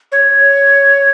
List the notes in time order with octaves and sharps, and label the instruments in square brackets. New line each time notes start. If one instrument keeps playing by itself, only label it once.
[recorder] C#5